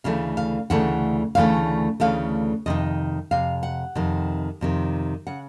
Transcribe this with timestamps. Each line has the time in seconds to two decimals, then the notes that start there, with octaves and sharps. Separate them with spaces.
0.04 D2 C#3 E3 A3 F5
0.37 F5
0.70 D2 C#3 E3 A3 F#5
1.35 D2 C#3 E3 A3 F5
2.00 D2 C#3 E3 A3 F5
2.66 F2 C3 D#3 D#5
3.31 F2 C3 F5
3.63 F#5
3.95 F2 C3 D#3
4.61 F2 C3 D#3
5.27 C#3 F#5